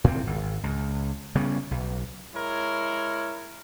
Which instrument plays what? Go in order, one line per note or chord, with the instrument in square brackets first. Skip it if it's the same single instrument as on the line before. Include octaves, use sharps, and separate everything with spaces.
[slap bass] A2 C4
G#1
C#2
C#3 G3 B3 C#4
B1
[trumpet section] G#3 E4 A#4 C#5